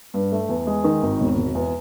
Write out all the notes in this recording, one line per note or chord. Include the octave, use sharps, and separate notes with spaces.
G2
A3
E2
G#3
D#3
G#1
E1
E1
E2